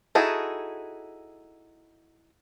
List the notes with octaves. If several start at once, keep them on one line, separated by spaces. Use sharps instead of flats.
D#4 E4 F#4 G#4 A4